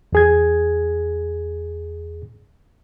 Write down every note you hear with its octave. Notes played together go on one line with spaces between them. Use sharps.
E2 G#4 G#6